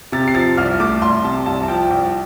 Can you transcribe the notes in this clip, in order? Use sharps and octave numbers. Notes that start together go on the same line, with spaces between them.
C3 A6
C7
F3 A6
C2 F6
A3 D6
C2 C6
C3 A5
C2 A5
A5
F3 G5
C2 G5